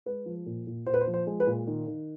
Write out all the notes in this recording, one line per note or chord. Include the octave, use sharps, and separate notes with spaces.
G#3 B4
F3
A#2
A#2
A#2 C5
B4
C5
F3
C5
G#3
B4
A#2
D#3
D#3